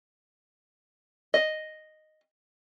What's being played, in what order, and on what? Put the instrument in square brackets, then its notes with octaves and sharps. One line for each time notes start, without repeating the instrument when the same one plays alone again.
[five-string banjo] D#5